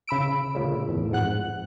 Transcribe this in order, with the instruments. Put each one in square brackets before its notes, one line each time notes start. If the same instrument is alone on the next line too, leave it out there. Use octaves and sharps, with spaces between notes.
[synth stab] C#3 B5 E6 D7
D2 A#2 C#3
E2 A2
F2 G#2 F#5 F#6